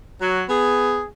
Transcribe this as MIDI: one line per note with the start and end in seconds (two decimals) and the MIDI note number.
0.21 0.43 54
0.49 1.04 59
0.49 1.04 68